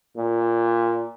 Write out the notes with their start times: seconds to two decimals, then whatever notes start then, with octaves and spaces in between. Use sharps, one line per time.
0.17 A#2